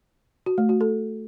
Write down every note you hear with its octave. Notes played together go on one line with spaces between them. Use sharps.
F#4
A3
F#4
A4